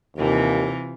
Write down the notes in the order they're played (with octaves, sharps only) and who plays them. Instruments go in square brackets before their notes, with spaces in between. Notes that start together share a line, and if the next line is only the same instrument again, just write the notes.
[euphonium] D#2 [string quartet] C3 E3 F4